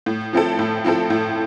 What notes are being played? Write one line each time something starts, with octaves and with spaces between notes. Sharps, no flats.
A2
F3 C4 E4 A4
A2
F3 C4 E4 A4
A2